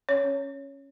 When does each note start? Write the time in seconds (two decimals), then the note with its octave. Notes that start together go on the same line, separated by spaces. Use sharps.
0.09 C#4 C#5
0.24 C#4